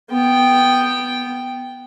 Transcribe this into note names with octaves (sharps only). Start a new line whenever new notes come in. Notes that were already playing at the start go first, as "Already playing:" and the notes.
B3 G5